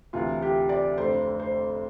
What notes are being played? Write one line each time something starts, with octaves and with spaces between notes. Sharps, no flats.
D2 C3 E3 F4
G4
D5
F1 F2 D3 C5
C5